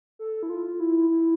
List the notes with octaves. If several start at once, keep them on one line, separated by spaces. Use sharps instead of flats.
A4
E4
F4
E4
E4